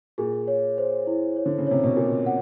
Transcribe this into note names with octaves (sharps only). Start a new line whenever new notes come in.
A#2 G#4
C#5
C5
E4
C#5
D3
C#3
C3 C#5
B2
A#2 A#4
F#5